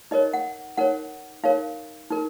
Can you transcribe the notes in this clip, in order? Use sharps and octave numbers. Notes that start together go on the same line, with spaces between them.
D#4 A#4 C#5 D#5
F#5
D#4 A#4 C#5 F#5
D#4 A#4 C#5 F5
D#4 A#4